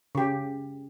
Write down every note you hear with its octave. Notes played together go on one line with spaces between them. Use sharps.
C#3 G4